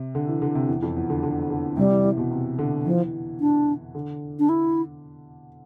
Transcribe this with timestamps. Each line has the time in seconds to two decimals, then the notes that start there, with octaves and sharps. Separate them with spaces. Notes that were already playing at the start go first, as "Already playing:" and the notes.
Already playing: C3
0.15 D3
0.28 E3
0.42 D3
0.55 C3
0.68 E2
0.83 F2
0.96 E2
1.10 D3
1.23 D3
1.51 D3
1.77 C3 G3
1.91 E3
2.04 E3
2.17 B2
2.31 C3
2.59 D3
2.85 E3 F3
3.40 D4
3.95 D3
4.39 D4
4.49 E4